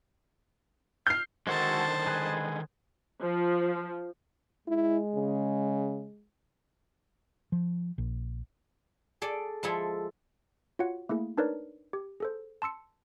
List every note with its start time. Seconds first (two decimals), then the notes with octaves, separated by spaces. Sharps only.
1.07 F6 G6 C7
1.47 D3 D#3 G#3 F#4 A4 A#4 C5 A5
2.06 G#3 G#4 B4
3.21 F3
4.68 G#3 E4
5.15 C#3
7.52 F3
7.98 A#1
9.22 G#4 A4 D5
9.63 F3 G#3 E4 G#4 A4
10.79 F4 F#4 C#5 F#5
11.09 A3 A#3 E4 G#4
11.37 D4 D#4 A#4 B4 C#5 D5
11.93 G4
12.20 G#4 A4 C5
12.62 A5 C6 E6 C#7